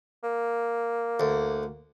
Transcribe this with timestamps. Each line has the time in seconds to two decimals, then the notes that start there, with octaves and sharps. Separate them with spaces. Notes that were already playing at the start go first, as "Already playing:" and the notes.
0.23 A#3
1.20 D2